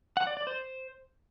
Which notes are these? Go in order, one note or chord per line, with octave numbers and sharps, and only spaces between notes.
F#5
D5
D5
C5